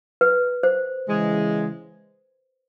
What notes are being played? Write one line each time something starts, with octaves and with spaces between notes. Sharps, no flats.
B4
C5
C#3 E3 G#3